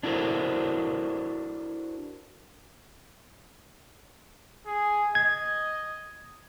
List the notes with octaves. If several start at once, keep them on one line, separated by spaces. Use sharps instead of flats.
D4 E4 F#4 A4 A#4 C5
G#4
D#5 G#6